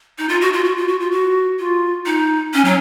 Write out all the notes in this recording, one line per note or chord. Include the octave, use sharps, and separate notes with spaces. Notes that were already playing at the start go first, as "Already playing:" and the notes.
D#4
F4
F#4
F4
F#4
F4
F#4
F4
F#4
F4
D#4
C#4
F#3